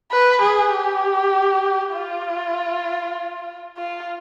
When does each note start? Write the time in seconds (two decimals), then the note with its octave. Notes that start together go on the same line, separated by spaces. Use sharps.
0.12 B4
0.42 G#4
0.73 G4
1.94 F4
3.77 F4